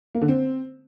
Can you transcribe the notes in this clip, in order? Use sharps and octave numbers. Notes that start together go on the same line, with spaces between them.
A#3
D3
C4